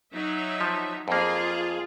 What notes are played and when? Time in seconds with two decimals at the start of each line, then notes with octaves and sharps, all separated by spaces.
0.12 F#3 D#4 E5
0.61 F3
1.08 F2 A#3 F4 G#4